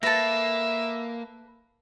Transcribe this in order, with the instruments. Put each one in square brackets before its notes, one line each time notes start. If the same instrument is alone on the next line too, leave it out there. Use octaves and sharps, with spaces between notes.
[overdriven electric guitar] A#3 [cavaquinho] A4 B4 [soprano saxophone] E5 [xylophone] A6 A#6